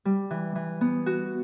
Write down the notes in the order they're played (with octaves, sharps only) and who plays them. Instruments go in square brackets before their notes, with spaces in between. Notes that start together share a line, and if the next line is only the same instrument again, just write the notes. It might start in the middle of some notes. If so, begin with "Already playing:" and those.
[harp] G3
E3
E3
B3
F#4